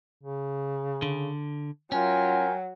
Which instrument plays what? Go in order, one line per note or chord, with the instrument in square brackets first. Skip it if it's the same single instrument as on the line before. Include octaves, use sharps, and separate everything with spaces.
[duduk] C#3
[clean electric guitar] D3
[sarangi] F#3 [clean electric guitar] C#4 [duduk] F4 [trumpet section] A#4 G5 G#5